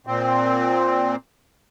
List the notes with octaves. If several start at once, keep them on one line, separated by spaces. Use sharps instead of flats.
A#2 C4